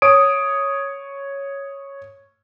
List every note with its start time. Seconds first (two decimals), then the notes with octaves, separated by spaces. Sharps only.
0.02 C#5 D#6 D7